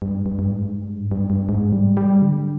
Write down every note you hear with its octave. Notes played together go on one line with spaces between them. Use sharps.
G2
G2
G2
G#2
G2
G#2
G2
G2
G2
G#2
G3
G3
D3